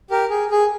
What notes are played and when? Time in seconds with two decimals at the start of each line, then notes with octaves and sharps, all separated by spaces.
0.10 G4 A#4
0.30 G#4
0.51 G#4